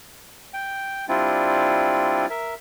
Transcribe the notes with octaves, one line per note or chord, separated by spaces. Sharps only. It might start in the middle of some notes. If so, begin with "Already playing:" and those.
G5
G3 C4 D4 E4 F4
A#4 E5